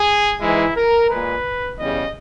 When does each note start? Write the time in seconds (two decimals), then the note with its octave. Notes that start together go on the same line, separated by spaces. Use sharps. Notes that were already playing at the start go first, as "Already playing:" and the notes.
Already playing: G#4
0.41 G#2 E3 G#3 E4
0.76 A#4
1.11 A#2 G#3 B4
1.79 E2 C#3 G3 D#5